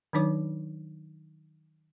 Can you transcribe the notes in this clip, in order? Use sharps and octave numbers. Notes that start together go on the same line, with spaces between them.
D#3 F#3 D4 D#4 C#5 D6